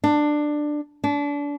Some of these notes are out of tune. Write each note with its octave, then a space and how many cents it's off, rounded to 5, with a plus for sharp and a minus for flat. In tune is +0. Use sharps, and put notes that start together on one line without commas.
D4 +15
D4 -30